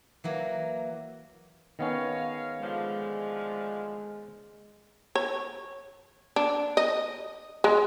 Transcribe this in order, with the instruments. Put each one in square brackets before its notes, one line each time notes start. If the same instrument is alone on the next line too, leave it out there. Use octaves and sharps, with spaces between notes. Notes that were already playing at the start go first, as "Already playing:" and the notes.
[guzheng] E3 F#3 A#3
[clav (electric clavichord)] D#3 B3 C#4 [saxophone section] G#3 C#5 F5
[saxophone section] A2 D3 F3 [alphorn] G#3
[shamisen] C#5
D4
D#5
G#3